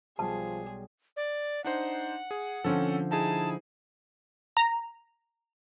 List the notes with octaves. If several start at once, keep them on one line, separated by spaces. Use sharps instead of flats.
B1 F3 G3 G#4 A5 C6
D5
D4 D#4 C5 F#5
G#4
D3 F3 C4 C#4 A4
D#4 E4 G#4 A5
A#5